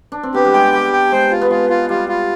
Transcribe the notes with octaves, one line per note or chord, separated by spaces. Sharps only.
D4
C4
B3 G4
G3
G#3 G5
G3 G4
G5
G#3 C5
F4
B3
G#3 F4
F4
G3 F4
F4